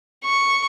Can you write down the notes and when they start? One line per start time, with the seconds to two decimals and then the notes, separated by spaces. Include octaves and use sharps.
0.25 C#6